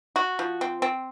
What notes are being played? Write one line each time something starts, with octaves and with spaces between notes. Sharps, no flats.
F#4
F3
C4
C4